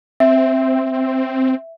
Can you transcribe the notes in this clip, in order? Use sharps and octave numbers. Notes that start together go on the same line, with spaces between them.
C4 E5